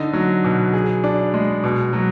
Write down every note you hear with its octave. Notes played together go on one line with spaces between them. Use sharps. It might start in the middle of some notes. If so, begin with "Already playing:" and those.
Already playing: D3 D#4
F#3
B2
G#4
D4
G#3
B2
F#3